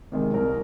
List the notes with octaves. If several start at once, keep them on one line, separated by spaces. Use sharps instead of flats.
C3 D#3 G#3
C2 A#4